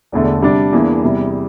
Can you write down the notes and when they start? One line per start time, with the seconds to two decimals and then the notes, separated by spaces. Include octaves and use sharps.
0.12 E1 E2 D3 A3
0.42 C3 G3 D4
0.73 E2 E3 A#3 D4
1.03 E2 C3 E3 G3